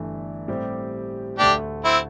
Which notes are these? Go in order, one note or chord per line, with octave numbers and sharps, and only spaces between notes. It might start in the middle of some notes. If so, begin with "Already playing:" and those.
Already playing: G1 G2 E3 A3
A2 G3 C4 G4
D2 D3 A3 D4 G4
C4 E4